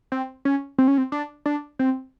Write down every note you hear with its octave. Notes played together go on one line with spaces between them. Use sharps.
C4
C#4
C4
C#4
C4
D4
D4
C4